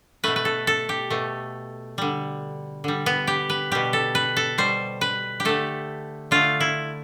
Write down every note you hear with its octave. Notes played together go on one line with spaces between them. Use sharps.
B2 A3 B4
B4
A4
A4
G4
B2 A3
D3 G3
D3 G3
B3
G4
B4
B2 G3 G4
A4
B4
A4
B2 G3 C5
B4
G4
D3 A3 A4
D3 A3 F4
E4